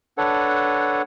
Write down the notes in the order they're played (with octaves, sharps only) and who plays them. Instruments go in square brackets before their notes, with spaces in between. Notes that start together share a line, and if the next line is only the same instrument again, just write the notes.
[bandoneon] D4 A4 B4 C#5 F#5